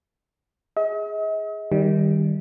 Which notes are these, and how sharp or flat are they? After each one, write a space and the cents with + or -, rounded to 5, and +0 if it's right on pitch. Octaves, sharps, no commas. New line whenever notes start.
G#4 +0 D#5 +45
D#3 +0 G3 +0